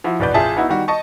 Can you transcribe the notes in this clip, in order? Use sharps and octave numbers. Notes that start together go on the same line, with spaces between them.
F3 E4 F#4
A#1 E2 B2 B4 D5 G6
A1 F4 G#4 E5 A5
B3 D#4 E4 F#4
D#3 G3 F#4
D#5 A5 C#6